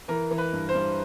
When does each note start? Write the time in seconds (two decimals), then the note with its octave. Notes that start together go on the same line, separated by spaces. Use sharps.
0.08 E3 A#4
0.31 E3
0.38 B4
0.53 G2
0.69 C5
0.75 G2